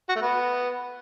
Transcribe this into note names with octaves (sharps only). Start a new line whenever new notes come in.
F#4
A3
B3